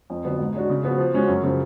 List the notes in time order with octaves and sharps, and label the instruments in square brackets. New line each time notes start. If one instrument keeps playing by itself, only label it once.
[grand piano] F2
D3 F#3 B3
G#2
G#3 D4 F#4
C#3
F3 B3 F#4
F3
G#3 C#4 F#4
F#2
C#3 F3